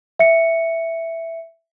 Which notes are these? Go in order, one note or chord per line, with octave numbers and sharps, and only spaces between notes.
E5 C#7